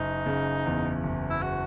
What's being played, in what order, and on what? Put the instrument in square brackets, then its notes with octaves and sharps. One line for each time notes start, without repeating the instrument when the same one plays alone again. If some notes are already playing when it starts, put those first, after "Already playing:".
Already playing: [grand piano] F#1 [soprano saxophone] D#4
[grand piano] C#3
E2
F#1
[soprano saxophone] E4
F#4